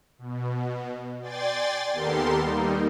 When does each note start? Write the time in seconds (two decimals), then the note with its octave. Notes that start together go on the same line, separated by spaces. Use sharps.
0.19 B2
1.21 D5 G5 G#5 C6 A6
1.93 D#2 B3 G4 A4 A#4 C6
2.41 G3 A#3 D#4